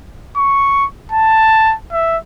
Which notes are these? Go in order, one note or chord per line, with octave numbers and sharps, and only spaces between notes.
C#6
A5
E5